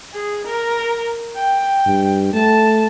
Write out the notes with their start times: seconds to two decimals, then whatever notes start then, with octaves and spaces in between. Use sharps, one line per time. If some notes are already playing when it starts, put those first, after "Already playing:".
0.13 G#4
0.45 A#4
1.35 G5
1.87 G2
2.34 A3 A5